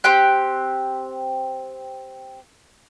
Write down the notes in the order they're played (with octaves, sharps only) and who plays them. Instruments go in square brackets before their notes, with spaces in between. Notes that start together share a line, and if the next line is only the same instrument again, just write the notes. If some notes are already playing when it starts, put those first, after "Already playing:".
[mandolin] C4 G4 G5 F#6